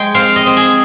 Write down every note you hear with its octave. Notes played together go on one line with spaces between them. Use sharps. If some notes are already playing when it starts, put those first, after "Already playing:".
Already playing: G#3 C5 G5
C4 F5
D#5
C4
G#4